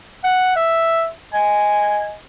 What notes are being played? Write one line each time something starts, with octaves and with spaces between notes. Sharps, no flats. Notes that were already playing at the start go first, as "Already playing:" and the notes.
F#5
E5
D#5 G#5